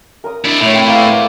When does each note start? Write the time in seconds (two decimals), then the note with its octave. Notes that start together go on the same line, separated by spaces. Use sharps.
0.24 A#4 D#6
0.45 D4 E4
0.61 A2 E4 C#5
0.74 C4 G5
0.88 A#3 B3